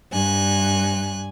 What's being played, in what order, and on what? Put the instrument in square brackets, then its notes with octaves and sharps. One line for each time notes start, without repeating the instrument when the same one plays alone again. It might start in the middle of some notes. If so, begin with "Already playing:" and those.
[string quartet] G2 G#5 F#6